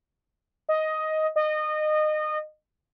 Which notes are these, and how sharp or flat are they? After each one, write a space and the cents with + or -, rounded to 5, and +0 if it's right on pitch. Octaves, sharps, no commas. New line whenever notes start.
D#5 +10
D#5 -25